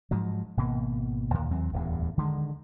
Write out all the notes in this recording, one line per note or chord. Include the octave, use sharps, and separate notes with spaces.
G#2 F3 F#3
G#1 B2 A#3
D2 A#2 D#3
D#2 F#3 C4
D1 E2 G2
D3 D#3 G#3